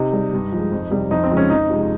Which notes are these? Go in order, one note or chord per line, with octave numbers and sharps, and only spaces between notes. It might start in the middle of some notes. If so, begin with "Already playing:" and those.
Already playing: C3 D#4
G3
G2
F3 G#3
F2
C3 G3
F2 D#4
C4
C#3 F3 G#3
C#4
F2 D#4
C3 F3 G#3